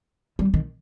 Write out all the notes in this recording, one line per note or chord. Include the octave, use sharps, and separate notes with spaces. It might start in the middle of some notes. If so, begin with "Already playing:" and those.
G3
D#3